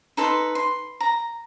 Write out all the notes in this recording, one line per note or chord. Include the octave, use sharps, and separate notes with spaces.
D#4 A4 B4 C6
C6
A#5